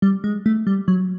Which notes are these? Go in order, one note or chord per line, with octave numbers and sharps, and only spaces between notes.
G3
G#3
A3
G3
F#3